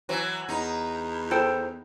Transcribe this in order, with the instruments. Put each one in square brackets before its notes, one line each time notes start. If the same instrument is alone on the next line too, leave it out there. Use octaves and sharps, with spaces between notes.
[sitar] E3 F#3
[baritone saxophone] E2 [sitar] D#4
[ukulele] A4 C5 G5